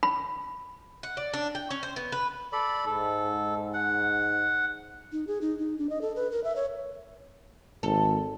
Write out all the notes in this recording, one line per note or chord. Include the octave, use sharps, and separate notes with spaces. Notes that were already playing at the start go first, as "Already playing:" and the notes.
B5
F#5
D5
D4
G5
C#4
C5
B3
B4
A4 D5 B5
G#2 A4
F#5
D#4
G#4
D#4
D#4
D4
D#5
A4
B4
A#4
E5
C#5
G#1 A4